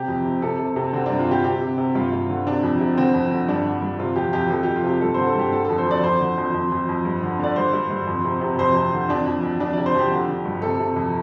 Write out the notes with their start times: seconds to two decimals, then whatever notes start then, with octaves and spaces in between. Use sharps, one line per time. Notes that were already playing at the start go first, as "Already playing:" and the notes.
Already playing: C3 G4
0.08 F2
0.25 C3
0.42 C3 A4
0.59 C3
0.76 C3
0.93 D3 C4
1.06 G2 D4
1.19 F4
1.28 D3 G4
1.44 C3 G4
1.61 C3
1.78 C3
1.95 G2 F4
2.12 G2
2.29 D3
2.46 C3 D4
2.63 F2
2.80 C3
2.97 D3 C4
3.14 F2
3.32 D3
3.48 G2 D4
3.66 D3
3.82 G2
3.99 C3 F4
4.16 F2 G4
4.33 F2 G4
4.51 F2 A4
4.63 F2 G4
4.76 F4
4.84 C3 G4
5.01 G2 A4
5.14 D3 C5
5.27 A4
5.35 G2 G4
5.52 D3 A4
5.65 F2 A4
5.78 C5
5.86 F2 D5
6.04 F2 C5
6.20 D3
6.38 F2
6.54 F2
6.72 F2
6.89 F2
7.05 G2
7.23 D3
7.39 D3 D5
7.56 G2 C5
7.73 G2
7.90 G2
8.07 F2
8.24 C3
8.41 C3
8.59 F2 C5
8.76 F2
8.93 D3
9.09 F2 D4
9.26 F2
9.43 F2
9.60 F2 D4
9.73 C3 D5
9.86 C5
9.94 F2 G4
10.12 D3
10.29 D3
10.45 G2
10.62 C3 A4
10.80 C3
10.96 F2